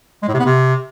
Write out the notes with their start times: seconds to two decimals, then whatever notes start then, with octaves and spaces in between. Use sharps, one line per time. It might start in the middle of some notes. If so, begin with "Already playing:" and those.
0.22 G#3
0.28 A2
0.34 C3
0.40 B3
0.46 C3